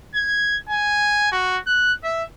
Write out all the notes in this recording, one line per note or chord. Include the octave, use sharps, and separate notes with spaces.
G#6
G#5
F#4
F#6
E5